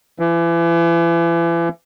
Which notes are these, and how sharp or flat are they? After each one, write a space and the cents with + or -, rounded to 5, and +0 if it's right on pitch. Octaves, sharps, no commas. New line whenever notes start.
E3 +35